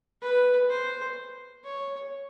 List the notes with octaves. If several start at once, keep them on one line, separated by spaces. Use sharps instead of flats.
B4
C5
C#5